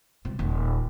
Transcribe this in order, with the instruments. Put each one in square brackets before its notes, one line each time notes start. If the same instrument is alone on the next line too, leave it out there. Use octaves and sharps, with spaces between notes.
[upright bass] C3 G3
D#1